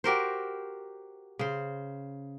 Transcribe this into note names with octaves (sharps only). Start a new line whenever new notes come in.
F#4 G4 A#4 C5
C#3 C5